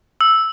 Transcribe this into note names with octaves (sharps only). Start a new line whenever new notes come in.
E6